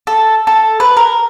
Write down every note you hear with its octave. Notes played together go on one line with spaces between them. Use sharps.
A4
A4
B4
A#4